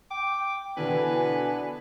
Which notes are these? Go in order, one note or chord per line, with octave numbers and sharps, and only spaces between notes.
G5 D6
B2 D3 E3 B3 D4 B4 G#5